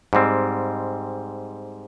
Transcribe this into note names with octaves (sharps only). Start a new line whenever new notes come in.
G#2 G3 C4